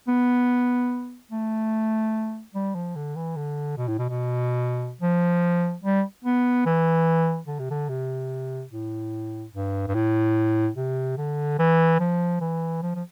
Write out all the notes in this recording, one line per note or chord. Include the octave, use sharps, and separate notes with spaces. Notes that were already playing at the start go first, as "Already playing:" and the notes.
B3
A3
G3
F3
D3
E3
D3
B2
A2
B2
B2
F3
G3
B3
E3
D3
C3
D3
C3
A2
G2
G2
A2
C3
D3
E3
F3
E3
F3
F3